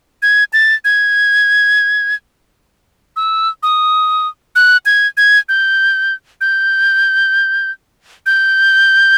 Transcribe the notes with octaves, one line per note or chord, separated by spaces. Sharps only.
G#6
A6
G#6
E6
D#6
F#6
G#6
G#6
G6
G6
G6